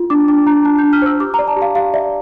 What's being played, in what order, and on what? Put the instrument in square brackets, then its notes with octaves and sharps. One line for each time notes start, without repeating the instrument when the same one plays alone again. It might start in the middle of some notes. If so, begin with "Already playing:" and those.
Already playing: [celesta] F4
D4 D6
D4 D6
D4 A#5
D4 A5
G6
D4
F6
C5 E6
G4 D6
A#5
D5
A5
G4
F5
G4 F5
D5 E5